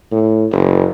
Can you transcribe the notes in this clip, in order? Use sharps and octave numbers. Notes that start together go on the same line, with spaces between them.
A2
F#1